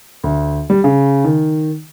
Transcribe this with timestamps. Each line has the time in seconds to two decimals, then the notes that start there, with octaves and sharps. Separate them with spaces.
0.24 D2
0.70 G3
0.84 C#3
1.24 D#3